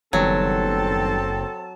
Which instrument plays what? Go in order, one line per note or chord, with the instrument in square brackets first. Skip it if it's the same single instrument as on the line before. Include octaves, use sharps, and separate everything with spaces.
[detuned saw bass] F#1 [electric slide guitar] D#3 G3 B3 [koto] F#3 [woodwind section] C4 A4 A5